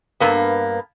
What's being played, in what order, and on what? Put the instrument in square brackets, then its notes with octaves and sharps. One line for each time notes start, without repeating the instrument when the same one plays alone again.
[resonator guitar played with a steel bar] G2 A#3 B3